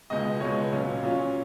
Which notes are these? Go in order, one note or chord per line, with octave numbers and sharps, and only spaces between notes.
C#2 B2 G#3 D#5
C#2 B2 G#3 C#5
A#2 F#3 C#4 F4
A#2 F#3 C#4 F4